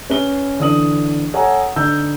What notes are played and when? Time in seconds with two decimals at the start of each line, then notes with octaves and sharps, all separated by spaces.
0.10 C#4 B4 G7
0.59 D3 E3 D#6 F#7
1.34 A4 C#5 F#5 G#5 A#5
1.76 D3 D#4 E6 G6